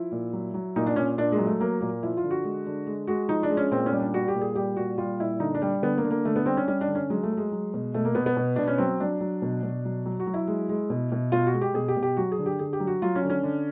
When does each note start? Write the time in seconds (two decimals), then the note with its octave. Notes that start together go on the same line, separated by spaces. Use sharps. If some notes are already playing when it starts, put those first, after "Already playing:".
Already playing: F3 E4
0.12 A#2
0.33 F#3
0.54 F#3
0.76 A#2 D#4
0.86 D4
0.96 A#2 C#4
1.18 A#2 D4
1.32 G#3
1.38 F#3
1.47 A3
1.60 F#3 A#3
1.81 A#2 A#3
2.03 F3 E4
2.17 F4
2.24 D3
2.31 F#4
2.44 G#3
2.66 D3
2.87 G#3
3.07 G#3 F#4
3.29 F3 D#4
3.43 D4
3.50 G#3
3.57 C#4
3.72 A#2 C4
3.86 C#4
3.92 G3
3.99 D4
4.14 G3 F#4
4.28 G4
4.35 A#2
4.41 G#4
4.55 G3 G4
4.77 A#2 F#4
4.98 G3 F4
5.20 A#2 E4
5.40 D3 D#4
5.55 D4
5.62 G3
5.82 D3 B3
5.98 A#3
6.04 D3
6.10 A#3
6.25 D3 A3
6.36 B3
6.46 G3 C4
6.57 C#4
6.67 G3 C#4
6.81 D4
6.88 D3
6.95 C#4
7.10 F#3 G#3
7.23 A3
7.31 F#3
7.37 G#3
7.52 F#3
7.74 B2
7.94 B2 A3
8.05 A#3
8.15 B2 B3
8.26 B3
8.37 B2
8.56 B2 D4
8.68 C#4
8.78 F#3 C4
9.00 F#3 D4
9.21 F#3
9.42 B2
9.63 B2
9.85 F#3
10.06 F#3
10.20 F#4
10.27 F#3
10.34 E4
10.47 G#3
10.69 G#3
10.90 B2
11.12 B2
11.32 B2 F4
11.47 F#4
11.53 G#3
11.61 G4
11.74 B2 G#4
11.88 G4
11.96 B2
12.03 G4
12.17 F#3 F#4
12.32 G#4
12.39 D3
12.46 G4
12.59 D3 G#4
12.73 G4
12.80 F#3
12.87 F#4
13.02 F#3 F4
13.15 C#4
13.23 D3
13.30 C#4
13.43 D3